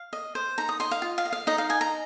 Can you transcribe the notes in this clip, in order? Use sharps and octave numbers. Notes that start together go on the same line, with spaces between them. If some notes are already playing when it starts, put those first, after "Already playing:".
Already playing: F5
D#5
C5
D#4 A#5
D#6
D#5 C6
F5
F4
F5
D#5
F5
D#4 D#5
F5
D#5 G#5
A#5